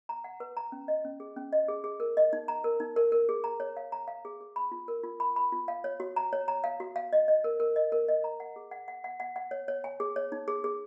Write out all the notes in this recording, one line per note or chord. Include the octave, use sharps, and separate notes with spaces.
A#5
F#5
B4
A#5
C#4
D#5
C#4
G#4
C#4
D#5
G#4
G#4
A#4
D#5
D#4
A#5
A#4
D#4
A#4
A#4
G#4
A#5
C#5
F5
A#5
F5
G#4
G#4
B5
F4
A#4
F4
B5
B5
F4
F5
C#5
F#4
A#5
C#5
A#5
F5
F#4
F5
D#5
D#5
A#4
A#4
D#5
A#4
D#5
A#5
F#5
G#4
F#5
F#5
F#5
F#5
F#5
C#5
C#5
G#5
G#4
C#5
D#4
G#4
G#4